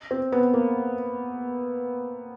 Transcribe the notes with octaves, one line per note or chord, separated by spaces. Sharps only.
C4
B3
A#3